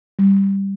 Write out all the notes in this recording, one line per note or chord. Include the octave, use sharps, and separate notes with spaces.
G3